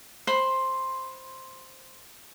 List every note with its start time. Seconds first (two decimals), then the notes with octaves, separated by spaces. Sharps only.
0.27 C5 B5 C6